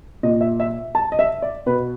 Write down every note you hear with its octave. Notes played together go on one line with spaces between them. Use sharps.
A#2 D#5
E5
E5
A5
D#5
E5
D5
B2 B4